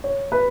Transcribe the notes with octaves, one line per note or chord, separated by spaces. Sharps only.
C#5
B4